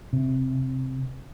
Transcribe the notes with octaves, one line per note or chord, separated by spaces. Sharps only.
C3